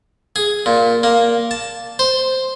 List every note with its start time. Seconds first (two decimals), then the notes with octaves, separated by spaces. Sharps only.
0.36 G#4
0.66 A#2
1.03 A#3
1.51 A5
1.99 C5